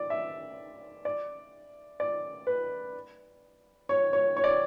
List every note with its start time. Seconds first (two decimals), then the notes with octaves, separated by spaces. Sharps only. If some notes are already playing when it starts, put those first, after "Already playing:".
Already playing: D5
0.10 E5
1.05 D5
2.00 D5
2.47 B4
3.89 C#5
4.13 C#5
4.37 C#5
4.44 D5